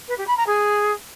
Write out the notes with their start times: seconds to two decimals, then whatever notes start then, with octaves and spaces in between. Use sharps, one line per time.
0.08 B4
0.18 G4
0.28 B5
0.37 A#5
0.47 G#4